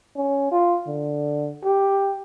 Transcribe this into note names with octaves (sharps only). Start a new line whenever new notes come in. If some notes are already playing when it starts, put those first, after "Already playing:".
C#4
F4
D3
G4